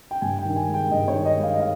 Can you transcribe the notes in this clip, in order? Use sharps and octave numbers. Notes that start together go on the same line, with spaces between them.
G5
G2 G#5
G5
D#3
G#5
G#3
G5
G2 D#5
C#5
D#3
D#5
G#3
F5
D#5
F5